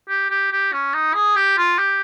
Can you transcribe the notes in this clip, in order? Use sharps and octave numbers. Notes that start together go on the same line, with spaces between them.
G4
G4
G4
C#4
D#4
G#4
G4
F4
G4